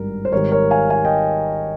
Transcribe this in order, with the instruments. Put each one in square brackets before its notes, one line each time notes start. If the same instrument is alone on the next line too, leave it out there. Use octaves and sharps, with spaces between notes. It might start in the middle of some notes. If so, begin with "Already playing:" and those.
Already playing: [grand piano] G#1 G2 G3 A#4
C5
G#1 G#2 D#3 G3 A#4 C#5
A#4 C#5
F5 G#5
F5 G#5
D#5 G5